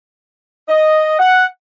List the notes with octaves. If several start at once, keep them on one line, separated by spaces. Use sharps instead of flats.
D#5
F#5